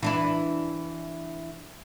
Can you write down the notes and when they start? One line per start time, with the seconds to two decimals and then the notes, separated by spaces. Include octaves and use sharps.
0.03 E3 D4 E4